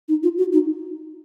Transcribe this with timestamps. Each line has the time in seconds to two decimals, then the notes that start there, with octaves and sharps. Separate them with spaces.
0.09 D#4
0.23 F4
0.38 F#4
0.53 D#4